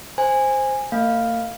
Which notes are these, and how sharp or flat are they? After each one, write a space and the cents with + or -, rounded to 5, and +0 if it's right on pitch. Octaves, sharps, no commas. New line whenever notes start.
C5 +0 G#5 -15
A#3 -45 F5 +0